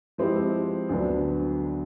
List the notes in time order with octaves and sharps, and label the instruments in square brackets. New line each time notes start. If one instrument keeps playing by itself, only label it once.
[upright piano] F3 G#3 C4 E4 G4
D2 D3 F#3 B3 D4